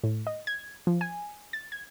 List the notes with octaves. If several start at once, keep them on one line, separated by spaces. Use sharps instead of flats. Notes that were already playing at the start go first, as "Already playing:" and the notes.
A2
D#5
G#6
F3
G#5
A6
G#6